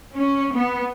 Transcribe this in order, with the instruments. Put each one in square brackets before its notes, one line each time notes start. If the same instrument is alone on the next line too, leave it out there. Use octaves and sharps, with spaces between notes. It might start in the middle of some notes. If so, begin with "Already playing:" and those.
[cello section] C#4
B3